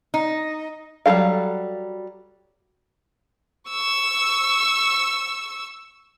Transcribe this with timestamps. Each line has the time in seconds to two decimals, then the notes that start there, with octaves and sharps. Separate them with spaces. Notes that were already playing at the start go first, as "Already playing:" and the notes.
0.14 D#4
1.06 F#3 G3 F4 A4 F5
3.70 C#6 E6